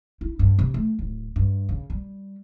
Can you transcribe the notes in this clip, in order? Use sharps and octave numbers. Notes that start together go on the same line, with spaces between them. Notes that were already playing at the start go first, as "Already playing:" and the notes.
E4
G2
C3
A3
D1
G2
C#3
G3